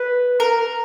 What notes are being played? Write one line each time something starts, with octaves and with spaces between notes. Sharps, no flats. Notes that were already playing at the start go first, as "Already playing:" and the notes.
Already playing: B4
A#4